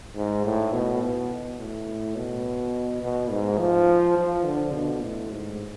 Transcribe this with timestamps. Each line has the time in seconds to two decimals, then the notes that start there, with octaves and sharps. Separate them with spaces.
0.16 G#2
0.45 A2
0.73 B2
1.03 B2
1.59 A2
2.16 B2
3.03 B2
3.31 G#2
3.59 F3
4.17 F3
4.45 D3
4.74 B2
5.03 A2
5.31 G#2